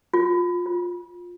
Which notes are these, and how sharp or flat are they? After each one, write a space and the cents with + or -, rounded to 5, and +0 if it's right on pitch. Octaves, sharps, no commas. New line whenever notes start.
F4 +20
F4 +10